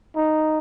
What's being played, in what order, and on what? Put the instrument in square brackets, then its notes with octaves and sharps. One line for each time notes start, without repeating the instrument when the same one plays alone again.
[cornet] D#4